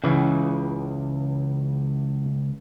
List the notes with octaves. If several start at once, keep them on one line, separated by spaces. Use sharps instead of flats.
C#2 C#3 E3